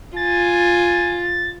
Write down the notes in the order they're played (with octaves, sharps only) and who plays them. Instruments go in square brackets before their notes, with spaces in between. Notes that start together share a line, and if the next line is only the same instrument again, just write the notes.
[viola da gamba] F4 [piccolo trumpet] G#5 [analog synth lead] A6